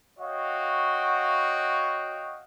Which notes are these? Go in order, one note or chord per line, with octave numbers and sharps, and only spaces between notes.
F#4 C#5 D#5 F5 G5